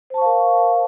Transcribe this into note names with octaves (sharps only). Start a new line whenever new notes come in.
A#4 C5 F5 A5 C#6